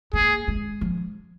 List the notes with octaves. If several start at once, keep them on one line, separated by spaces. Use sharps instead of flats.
A#3 G#4
G#3
F3